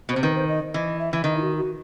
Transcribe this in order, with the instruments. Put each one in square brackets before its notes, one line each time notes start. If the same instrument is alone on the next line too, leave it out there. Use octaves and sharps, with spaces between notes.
[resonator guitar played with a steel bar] B2
[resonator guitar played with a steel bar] C3 [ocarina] C5
[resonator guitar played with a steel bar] D#3 [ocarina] B4
[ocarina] C5
D#5
[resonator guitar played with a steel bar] E3 [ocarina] D#5
[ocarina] E5
[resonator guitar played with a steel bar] E3 [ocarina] E5
[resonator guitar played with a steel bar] D#3 [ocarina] D#5
[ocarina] E4
F#4
F#4